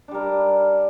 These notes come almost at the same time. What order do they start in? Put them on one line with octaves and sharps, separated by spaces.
D4 G3 A#4